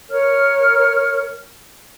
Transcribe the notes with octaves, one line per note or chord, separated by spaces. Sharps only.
A#4 C#5 F6